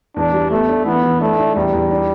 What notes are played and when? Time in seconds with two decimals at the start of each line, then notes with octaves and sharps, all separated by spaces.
0.16 E2 D4
0.34 G3
0.51 A3 B3
0.69 D4
0.86 E3 B3
1.03 E3
1.21 A3 D4
1.38 D4
1.56 E2 G3
1.73 E2
1.91 D4